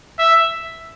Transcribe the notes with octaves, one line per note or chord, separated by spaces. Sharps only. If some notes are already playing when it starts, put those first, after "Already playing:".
E5